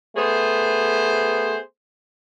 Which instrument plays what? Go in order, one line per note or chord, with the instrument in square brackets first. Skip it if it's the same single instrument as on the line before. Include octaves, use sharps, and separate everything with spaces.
[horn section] A3 B3 G#4 C5